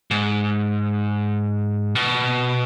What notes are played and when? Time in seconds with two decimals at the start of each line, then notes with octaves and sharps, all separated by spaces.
0.11 G#2
1.95 B2